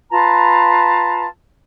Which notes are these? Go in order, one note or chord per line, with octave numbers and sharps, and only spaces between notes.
F4 B4 A5 A#5